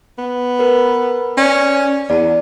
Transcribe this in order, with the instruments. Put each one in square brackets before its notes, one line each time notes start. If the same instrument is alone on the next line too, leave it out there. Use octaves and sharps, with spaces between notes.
[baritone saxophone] B3
[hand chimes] A#4 B4
[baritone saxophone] C#4 [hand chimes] D5
[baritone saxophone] E2 [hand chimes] D5